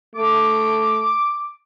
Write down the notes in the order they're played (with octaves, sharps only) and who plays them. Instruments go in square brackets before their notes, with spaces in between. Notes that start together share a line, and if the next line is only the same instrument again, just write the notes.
[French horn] A3 [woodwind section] D6